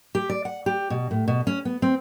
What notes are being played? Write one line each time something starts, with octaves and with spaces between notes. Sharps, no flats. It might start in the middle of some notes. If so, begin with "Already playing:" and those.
G4
D5
F#5
G4
B2
A2
B2
C#4
B3
C4